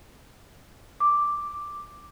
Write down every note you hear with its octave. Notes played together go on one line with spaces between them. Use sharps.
D6